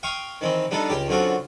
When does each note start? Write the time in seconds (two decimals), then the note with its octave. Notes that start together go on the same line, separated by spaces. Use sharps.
0.03 F5 G5 C6 C#6 D#6
0.41 D#3 E3 C4
0.71 G3 B3 D4 D#4 A4
0.90 C#2 G4 G5
1.08 F#2 D3 C4 F4 F#4